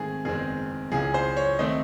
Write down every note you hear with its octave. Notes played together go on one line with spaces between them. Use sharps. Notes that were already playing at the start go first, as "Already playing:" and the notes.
Already playing: G#2 D#3 A3 C4 G#4
F#1 E2 D#3 G#3 C4 G#4
C#2 C#3 E3 G#4
C5
C#5
D#3 A3 C4 D#5